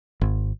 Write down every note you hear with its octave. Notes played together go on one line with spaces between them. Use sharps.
G#1